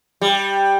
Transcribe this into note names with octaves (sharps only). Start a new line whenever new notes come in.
G3